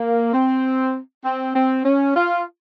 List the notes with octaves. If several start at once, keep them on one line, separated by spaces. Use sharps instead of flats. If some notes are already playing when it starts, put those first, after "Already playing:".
Already playing: A#3
C4
C4
C4
C#4
F4